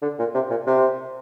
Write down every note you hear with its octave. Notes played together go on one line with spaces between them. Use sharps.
D3
A#2
C3
A#2
C3